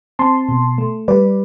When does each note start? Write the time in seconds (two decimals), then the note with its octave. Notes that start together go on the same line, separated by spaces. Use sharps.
0.19 C4 A5 C6
0.49 B2
0.78 A3
1.08 G3 B4 D5